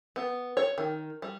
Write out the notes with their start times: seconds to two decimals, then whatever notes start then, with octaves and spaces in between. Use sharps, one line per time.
0.16 B3
0.57 C#5
0.78 D#3
1.22 G3